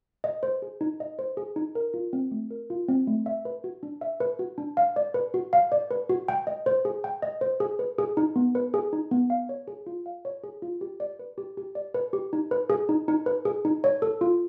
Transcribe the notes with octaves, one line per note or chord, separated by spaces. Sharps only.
D#5
C5
G#4
D#4
D#5
C5
G#4
D#4
A#4
F4
C4
A3
A#4
F4
C4
A3
E5
B4
F#4
D4
E5
B4
F#4
D4
F5
D5
B4
F#4
F5
D5
B4
F#4
G5
D#5
C5
G#4
G5
D#5
C5
G#4
B4
G#4
D#4
B3
B4
G#4
D#4
B3
F5
C#5
G#4
F4
F5
C#5
G#4
F4
G4
D5
B4
G4
G4
D5
B4
G4
D#4
B4
G#4
D#4
D#4
B4
G#4
D#4
C#5
A4
F4